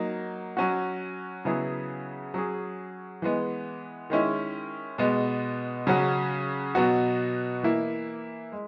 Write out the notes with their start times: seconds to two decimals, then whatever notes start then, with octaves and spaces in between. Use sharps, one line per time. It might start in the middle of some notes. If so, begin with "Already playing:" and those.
Already playing: F#3 A#3 D#4
0.57 F#3 C#4 F#4
1.45 C#3 F#3 B3 E4 G#4
2.34 F#3 C#4 G#4
3.22 E3 G#3 B3
4.10 D#3 G#3 C#4 E4
4.98 B2 G#3 B3
5.87 C#3 F#3 C#4 F#4
6.75 B2 F#3 B3 F#4
7.63 E3 A#3 E4
8.52 G#3